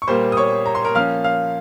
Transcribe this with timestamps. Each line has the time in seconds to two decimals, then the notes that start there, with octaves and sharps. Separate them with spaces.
0.02 C#6
0.07 A#2 G3 A#3 C5 C6
0.32 D#6
0.37 C#5 C#6
0.66 A#5
0.75 C6
0.85 A#4 A#5
0.95 F3 A#3 C#4 F5 F6
1.24 F5 F6